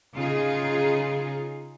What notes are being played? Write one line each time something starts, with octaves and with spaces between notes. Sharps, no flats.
C#3 D#4 F4 G#4